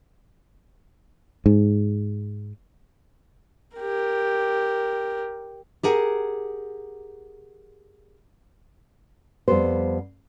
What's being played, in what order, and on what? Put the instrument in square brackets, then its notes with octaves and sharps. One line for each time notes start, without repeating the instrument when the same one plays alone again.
[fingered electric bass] G#2
[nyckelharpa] G4 A#4
[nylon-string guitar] G4 G#4 A#4 F#5
F2 G3 B3 C5